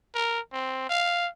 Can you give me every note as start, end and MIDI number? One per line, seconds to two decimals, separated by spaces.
0.15 0.40 70
0.53 0.88 60
0.89 1.28 77